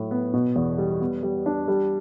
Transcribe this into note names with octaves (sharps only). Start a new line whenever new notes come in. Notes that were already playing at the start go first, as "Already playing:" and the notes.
Already playing: A2 F#3
B3
B2
E2
G3
B3
G3
D4
G3